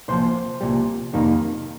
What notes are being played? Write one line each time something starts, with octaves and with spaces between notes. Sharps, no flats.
C2 A#2 F3 C5
C2 A#2 G3
F2 C3 D#3 G3 A#3